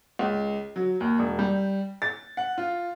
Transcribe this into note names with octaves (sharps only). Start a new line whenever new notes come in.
C#2
F#3
D#2
E1
G3
A6
F#5
F4